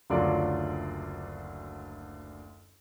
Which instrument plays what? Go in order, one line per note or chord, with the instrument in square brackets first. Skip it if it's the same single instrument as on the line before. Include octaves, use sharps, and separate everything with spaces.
[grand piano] F#1 D2 D3 F#3 F4 D5